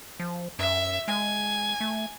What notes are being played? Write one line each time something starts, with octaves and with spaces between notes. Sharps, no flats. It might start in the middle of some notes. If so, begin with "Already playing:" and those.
F3
F#2 E5
G#3 G#5
A3